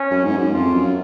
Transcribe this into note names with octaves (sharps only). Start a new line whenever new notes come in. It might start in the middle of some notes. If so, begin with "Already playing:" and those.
Already playing: C#4
F#2
G#2
F#2
F2 F4
F#2